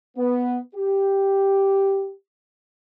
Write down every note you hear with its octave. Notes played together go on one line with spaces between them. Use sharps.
B3
G4